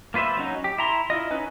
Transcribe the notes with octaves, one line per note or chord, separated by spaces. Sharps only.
A#3 F4 B4 C5 E5
F#3 C#4 D#4
G4
E4 A#5 C6
E4 F4 D#5
C#4 D#4 B4